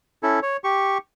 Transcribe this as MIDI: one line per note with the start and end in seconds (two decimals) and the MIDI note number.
0.23 0.40 61
0.23 0.40 64
0.23 0.40 69
0.42 0.57 73
0.64 0.98 67
0.64 0.98 85